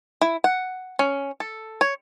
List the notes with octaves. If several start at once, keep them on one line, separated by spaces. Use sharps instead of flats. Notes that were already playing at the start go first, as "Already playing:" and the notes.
E4
F#5
C#4
A4
C#5